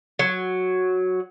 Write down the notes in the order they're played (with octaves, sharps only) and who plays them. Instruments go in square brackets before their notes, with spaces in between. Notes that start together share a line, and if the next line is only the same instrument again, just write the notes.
[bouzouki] F#3